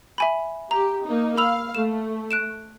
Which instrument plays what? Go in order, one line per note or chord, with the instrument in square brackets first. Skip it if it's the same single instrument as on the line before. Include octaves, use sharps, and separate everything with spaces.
[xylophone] E5 G#5 B5
[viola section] G4 [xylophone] A#5
[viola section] A#3 D#4
[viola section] F5 [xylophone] B5 E6 F7
[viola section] A3 [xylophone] E7
[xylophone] F#6 D7 E7